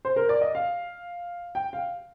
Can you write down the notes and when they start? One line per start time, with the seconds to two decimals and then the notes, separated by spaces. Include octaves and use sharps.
0.05 C5
0.16 A#4
0.29 D5
0.41 D#5
0.55 F5
1.55 G5
1.73 F5